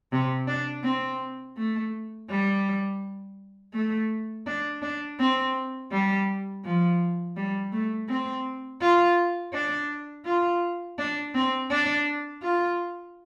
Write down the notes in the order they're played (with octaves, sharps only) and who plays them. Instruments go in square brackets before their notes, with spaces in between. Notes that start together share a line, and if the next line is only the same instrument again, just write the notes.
[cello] C3
D4
C4
A3
G3
A3
D4
D4
C4
G3
F3
G3
A3
C4
F4
D4
F4
D4
C4
D4
F4